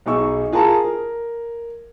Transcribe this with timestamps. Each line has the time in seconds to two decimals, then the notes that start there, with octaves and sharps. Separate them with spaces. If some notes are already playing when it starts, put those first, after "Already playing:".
0.06 B1 D#4 G#4 C#6 E6
0.52 F4 G#4 A#4 A5 A#5
0.84 A#4